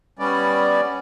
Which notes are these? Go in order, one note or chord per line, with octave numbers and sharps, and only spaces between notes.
G3 B3 C#4 D5